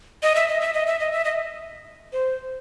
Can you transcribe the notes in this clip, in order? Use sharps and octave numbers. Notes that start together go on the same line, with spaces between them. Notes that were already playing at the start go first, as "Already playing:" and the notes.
D#5
E5
D#5
E5
D#5
E5
D#5
E5
D#5
C5